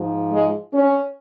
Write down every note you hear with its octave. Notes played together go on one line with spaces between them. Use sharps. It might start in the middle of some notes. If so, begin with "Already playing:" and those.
Already playing: G#2 F3
G#3
C#4